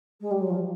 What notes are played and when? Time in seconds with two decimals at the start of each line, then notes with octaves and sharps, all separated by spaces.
0.21 G#3
0.31 G3
0.40 F#3
0.50 F3